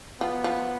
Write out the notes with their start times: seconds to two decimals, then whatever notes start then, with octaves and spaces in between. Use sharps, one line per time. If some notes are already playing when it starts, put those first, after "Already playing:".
0.21 F3 B3
0.44 F3